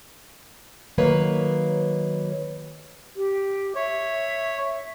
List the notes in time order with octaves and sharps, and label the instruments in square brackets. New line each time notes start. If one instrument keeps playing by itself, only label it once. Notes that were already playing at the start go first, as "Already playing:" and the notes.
[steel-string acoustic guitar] D#3 F#3 A#3 B4 C#5 F5
[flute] G4
[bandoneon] C#5 [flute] E5